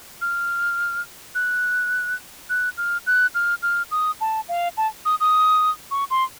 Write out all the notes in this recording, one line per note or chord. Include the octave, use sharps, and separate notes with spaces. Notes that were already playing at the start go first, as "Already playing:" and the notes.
F6
F#6
F#6
F6
F#6
F6
F6
D#6
A5
F5
A5
D#6
D#6
C#6
C6